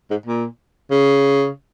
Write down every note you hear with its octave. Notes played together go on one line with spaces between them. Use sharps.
G#2
A#2
C#3